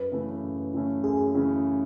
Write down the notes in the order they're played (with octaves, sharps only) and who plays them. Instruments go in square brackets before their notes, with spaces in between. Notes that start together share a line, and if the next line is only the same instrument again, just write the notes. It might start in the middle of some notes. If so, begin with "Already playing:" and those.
Already playing: [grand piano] F#2 [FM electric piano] B4
[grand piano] C#3 E3 A3 C#4
F#2
C#3 E3 A3 C#4
[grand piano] F#2 [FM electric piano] G#4
[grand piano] C#3 E3 A3 C#4